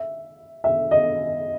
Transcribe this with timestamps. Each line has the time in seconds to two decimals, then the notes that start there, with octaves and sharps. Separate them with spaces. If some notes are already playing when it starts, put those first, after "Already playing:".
Already playing: E5
0.64 E5
0.91 D#5